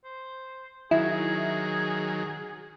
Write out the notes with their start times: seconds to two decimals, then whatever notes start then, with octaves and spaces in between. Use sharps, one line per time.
0.04 C5
0.91 D#3 F#3 E4 G#4